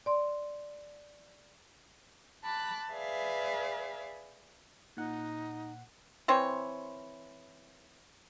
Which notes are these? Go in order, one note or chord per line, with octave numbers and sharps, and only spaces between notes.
D5 C6
A5 B5 D6 F#6
G#4 B4 D5 E5 F5
A#2 D#4 F#5
E3 C4 C5 C#5